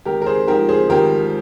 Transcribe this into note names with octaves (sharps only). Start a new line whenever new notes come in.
G#1 G4 A#4
A#4
G#4 C5
G#2 F3 G4 A#4
G#4 C5
G#1 G4 A#4